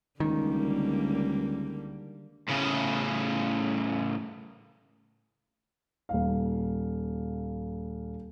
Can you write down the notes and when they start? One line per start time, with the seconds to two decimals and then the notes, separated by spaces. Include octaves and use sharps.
0.20 C#2 D3 D#3 G3 A#3
2.49 A2 C#3
6.09 D#1 F5